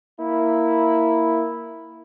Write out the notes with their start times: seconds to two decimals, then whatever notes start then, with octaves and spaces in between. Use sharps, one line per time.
0.19 A#3 E4